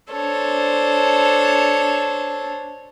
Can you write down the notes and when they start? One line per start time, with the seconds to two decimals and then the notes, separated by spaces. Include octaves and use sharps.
0.11 D4 A4 C5 C#5